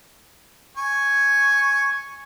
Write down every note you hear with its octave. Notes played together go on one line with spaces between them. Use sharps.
G#5 C#6